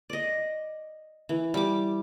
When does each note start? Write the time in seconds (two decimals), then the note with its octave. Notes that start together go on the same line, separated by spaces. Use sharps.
0.10 D5 D#5
1.29 E3
1.54 G3 D6